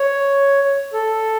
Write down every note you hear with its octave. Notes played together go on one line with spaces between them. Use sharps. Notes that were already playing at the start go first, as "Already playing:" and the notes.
Already playing: C#5
A4